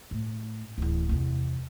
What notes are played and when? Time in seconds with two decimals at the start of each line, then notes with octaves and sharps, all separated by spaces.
0.11 A2
0.78 D1 E2
1.09 E2 C3